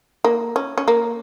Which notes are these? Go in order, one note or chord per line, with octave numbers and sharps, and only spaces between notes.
A#3
C#4
C#4
A#3